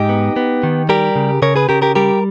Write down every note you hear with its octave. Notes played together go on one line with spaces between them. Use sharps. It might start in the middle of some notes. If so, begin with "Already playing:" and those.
Already playing: G#2 D#4 G4
B3
B3
D#3
G3 G4 A#4
C#3
C#3 A#4 C#5
G#4 B4
C#3 G4 A#4
G4 A#4
G3 G4 A#4